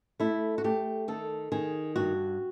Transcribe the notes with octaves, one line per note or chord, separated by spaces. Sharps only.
A3 E4
F#4
A3 G4
D#3 A4
D#3 G#4
G2 F#4